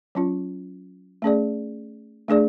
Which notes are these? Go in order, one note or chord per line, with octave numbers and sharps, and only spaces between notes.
F#3 C#4 F4
A3 C#4 G#4 D5
A3 D4 G#4 D5